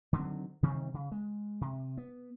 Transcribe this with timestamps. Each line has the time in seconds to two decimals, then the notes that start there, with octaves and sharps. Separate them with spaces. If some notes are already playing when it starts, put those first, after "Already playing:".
0.13 D3 D#3 F#3 C4
0.63 C3 D#3 G3 C4
0.94 C#3
1.12 G#3
1.61 C3
1.97 B3